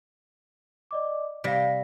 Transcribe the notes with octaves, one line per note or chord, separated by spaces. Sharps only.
D5 D#5 D6
C3 G3 F5 A#6 B6